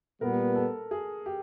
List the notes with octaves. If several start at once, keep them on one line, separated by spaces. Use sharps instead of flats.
A#2 G3 B3 A#4
A4
G#4
G4